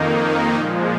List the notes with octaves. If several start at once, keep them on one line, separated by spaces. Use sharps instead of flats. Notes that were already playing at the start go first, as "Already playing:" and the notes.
Already playing: F2 D#3 A#3 D#4
A#2 F3 G#3